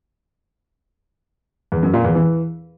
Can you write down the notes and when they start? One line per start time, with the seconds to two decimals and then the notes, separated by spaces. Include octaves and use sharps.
1.72 E2
1.83 F#2
1.94 A#2
2.04 E2
2.15 E3